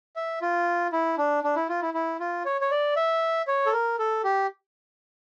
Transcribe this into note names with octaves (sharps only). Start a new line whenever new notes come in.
E5
F4
E4
D4
D4
E4
F4
E4
E4
F4
C#5
C#5
D5
E5
C#5
A4
A#4
A4
G4